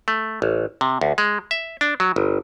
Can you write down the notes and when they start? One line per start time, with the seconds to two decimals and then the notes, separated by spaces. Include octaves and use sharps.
0.08 A3
0.42 A1
0.81 C3
1.01 D2
1.18 G#3
1.51 E5
1.81 D4
2.00 F#3
2.16 G1